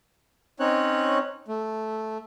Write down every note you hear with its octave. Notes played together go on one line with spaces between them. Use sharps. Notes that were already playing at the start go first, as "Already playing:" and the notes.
C4 C#4 D#4 C#5 F#6
A3